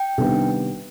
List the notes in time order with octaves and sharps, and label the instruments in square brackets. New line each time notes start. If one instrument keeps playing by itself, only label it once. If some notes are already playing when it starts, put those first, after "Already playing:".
Already playing: [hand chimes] G5
[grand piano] C3 D#3 G3 B3 D4